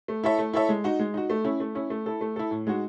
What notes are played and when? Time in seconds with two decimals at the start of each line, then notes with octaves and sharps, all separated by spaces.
0.08 A3
0.24 E4 A4 C#5 E5
0.38 A3
0.53 E4 A4 C#5 E5
0.69 G#3
0.84 D#4 F#4
0.99 G#3
1.14 D#4 F#4
1.30 A3
1.45 C#4 E4
1.60 A3
1.75 C#4 E4
1.90 A3
2.06 E4 A4
2.21 A3
2.36 E4 A4
2.51 A2
2.67 G#3 D#4 F#4